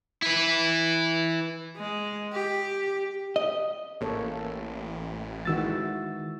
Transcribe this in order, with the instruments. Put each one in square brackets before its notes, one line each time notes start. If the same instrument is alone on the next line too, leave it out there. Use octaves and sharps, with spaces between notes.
[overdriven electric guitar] E4 B4
[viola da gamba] G#3
G4
[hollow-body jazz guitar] D#5
[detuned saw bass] A1 [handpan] A#3 A4 C#5
[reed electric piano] D#3 E6 A6 [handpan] E3 G#3 F#4